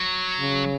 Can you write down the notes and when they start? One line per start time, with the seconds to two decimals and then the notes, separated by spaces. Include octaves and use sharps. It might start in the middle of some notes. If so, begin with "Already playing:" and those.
Already playing: F#3
0.40 C#3